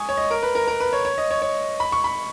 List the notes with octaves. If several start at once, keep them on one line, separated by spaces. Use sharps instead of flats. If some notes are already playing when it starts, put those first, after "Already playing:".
Already playing: G#5 C#6 D#6
C#5
D#5
A#4
B4
A#4
A#4
B4
C#5
C#5
D#5
C#5
C#5
B5
C#6
B5